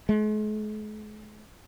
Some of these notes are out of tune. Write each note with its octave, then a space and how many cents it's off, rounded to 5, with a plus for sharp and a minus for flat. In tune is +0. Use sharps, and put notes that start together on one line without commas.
G#3 +45